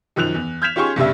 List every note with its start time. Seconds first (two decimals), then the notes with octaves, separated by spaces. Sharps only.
0.16 F#2 D#3 F3 F#6 F7
0.34 E2
0.62 F6 G6 G#6 B6 E7 F7
0.76 C#4 F4 G4 G#4 C6 C#6
0.96 G1 G2 C#3 G3 E5